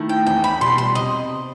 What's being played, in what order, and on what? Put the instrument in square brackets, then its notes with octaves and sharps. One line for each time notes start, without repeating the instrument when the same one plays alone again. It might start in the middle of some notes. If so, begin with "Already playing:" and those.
Already playing: [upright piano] D#3 A3 E4
[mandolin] G5
[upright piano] E2 [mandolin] G5
[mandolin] B5
[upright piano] B2 G3 [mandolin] C6
[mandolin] C6
[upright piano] C3 [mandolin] D#5